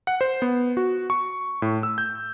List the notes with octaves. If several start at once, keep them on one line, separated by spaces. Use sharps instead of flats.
F#5
C5
B3
F#4
C#6
A2
E6
G6